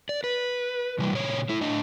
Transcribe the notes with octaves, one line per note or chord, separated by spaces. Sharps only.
D5
B4
C3 E3 G3
A#2 C#3 C#5
A3 E4
A2 D4 D#5